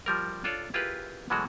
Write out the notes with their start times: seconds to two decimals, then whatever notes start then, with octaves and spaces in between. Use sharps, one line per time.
0.06 F3 G3 A#4
0.44 D4 F4 A4 C#5 D5
0.74 E4 F4 G4 G#4 A#4 B4
1.30 B2 E3 F#3 G#3 A3 F#4